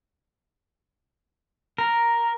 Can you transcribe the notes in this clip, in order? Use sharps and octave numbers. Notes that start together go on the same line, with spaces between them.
A#4